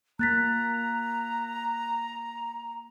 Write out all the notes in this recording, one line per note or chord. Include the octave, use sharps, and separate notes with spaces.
A#3 A#5 F#6 A6 B6